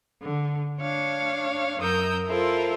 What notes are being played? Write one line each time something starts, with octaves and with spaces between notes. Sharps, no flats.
D3
D4 C#5 F5
F#2 A#4 D#6 E6 G6
E4 F4 A4 A#4 C5